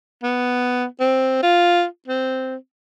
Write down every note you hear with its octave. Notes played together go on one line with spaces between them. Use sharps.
B3
C4
F4
C4